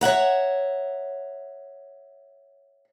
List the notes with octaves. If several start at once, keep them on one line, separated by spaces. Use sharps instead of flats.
C#5 E5 F#5 A#5